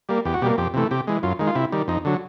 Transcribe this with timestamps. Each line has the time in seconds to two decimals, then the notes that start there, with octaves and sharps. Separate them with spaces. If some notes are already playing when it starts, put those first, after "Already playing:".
0.09 G3 A#3
0.25 E2 G4
0.34 F#4
0.42 B2 G3 A#3 G4
0.58 F2 G4
0.74 C3 E3 A3
0.91 C3 G4
1.07 E3 G#3
1.23 F#2 F4
1.39 D#3 G#3
1.47 F4
1.55 C3 E4
1.72 D#3 G3
1.88 F2 D#4
2.05 D3 F#3